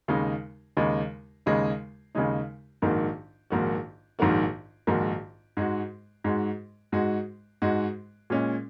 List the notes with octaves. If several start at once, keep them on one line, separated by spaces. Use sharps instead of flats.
D#2 C#3 G#3 D#4
D#2 C#3 G#3 D#4
D#2 C#3 G#3 D#4
D#2 C#3 G#3 D#4
A#1 G#2 D#3 A#3 F#4
A#1 G#2 D#3 A#3 F#4
A#1 G#2 D#3 A#3 F#4
A#1 G#2 D#3 A#3 F#4
G#2 G#3 F#4
G#2 G#3 F#4
G#2 G#3 F#4
G#2 G#3 F#4
A#2 G#3 C#4